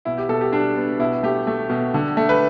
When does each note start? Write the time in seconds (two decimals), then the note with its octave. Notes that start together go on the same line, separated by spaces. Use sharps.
0.05 B2 E4
0.18 G4
0.29 B2 A4
0.41 G4
0.52 G3 D4
0.76 B3
0.99 B2 E4
1.23 A3 G4
1.47 A3
1.70 B2
1.94 D3
2.17 A3
2.29 B4